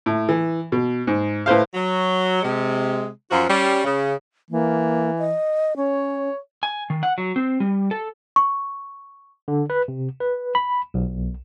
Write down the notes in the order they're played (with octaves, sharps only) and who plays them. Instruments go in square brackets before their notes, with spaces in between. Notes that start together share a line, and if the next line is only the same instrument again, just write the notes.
[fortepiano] A2
E3
B2
G#2
A2 B4 C5 F5
[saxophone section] F#3
C3 G#3
F#2 F3 F4 F#4
G3 C#4
C#3
[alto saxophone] E3 [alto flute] A#3
[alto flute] D#5
[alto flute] C#4 [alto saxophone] C#5
[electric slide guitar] G#5
D#3
F#5
F#3
C4
G3
A4
[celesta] C#6
[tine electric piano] D3
B4
C3
B4
B5
B1